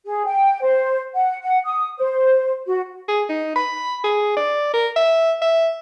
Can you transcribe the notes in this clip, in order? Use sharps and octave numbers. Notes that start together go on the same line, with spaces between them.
G#4
G5
C5
F#5
F#5
D#6
C5
F#4
G#4
D#4
B5
G#4
D5
A#4
E5
E5